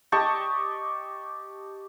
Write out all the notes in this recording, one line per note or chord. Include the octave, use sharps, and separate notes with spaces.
G4 D#5 A5 C#6